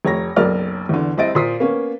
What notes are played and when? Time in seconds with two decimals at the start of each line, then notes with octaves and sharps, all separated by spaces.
0.05 F1 C#5 A#5 A#6
0.36 F#1 B1 A#4 D5 F6
0.89 E2 D3
1.17 C2 C4 E4 D#5 A6 D7
1.35 A#2 C5 D#6 B6 C7
1.60 A#3 B3 C#4